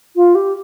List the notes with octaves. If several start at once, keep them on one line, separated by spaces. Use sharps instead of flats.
F4
G4